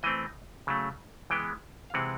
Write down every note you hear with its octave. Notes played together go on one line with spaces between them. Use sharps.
E3 A3 C4 D#5
C#3 F#3 A3
E3 G#3 B3 G5
F5
C3 E3 G#3 C4 F#5